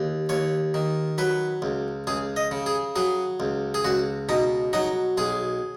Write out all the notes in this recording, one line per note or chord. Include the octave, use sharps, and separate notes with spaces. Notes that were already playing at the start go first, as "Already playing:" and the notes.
Already playing: D#2
D#2 C#5
D#3
F#3 B4
C#2
C#2 G#4
D#5
C#3
G#4
F#3 G#4
C#2
G#4
C#2 F#4
B2 D#4
F#3 D#4
B1 G#4